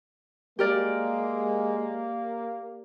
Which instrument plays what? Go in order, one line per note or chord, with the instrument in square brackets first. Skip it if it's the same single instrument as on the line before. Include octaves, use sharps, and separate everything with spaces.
[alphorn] G#3 [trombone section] A#3 [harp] G4 A#4 D5